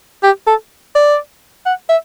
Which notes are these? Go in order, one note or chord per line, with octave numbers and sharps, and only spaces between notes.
G4
A4
D5
F#5
E5